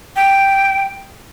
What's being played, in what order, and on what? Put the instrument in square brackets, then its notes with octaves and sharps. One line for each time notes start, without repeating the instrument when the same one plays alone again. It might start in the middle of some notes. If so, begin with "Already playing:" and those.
[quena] G5